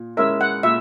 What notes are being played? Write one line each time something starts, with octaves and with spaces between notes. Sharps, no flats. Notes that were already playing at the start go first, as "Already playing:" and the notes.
Already playing: A#2
G#3 C#4 E4 A#4 E5
F#5
A#2 E5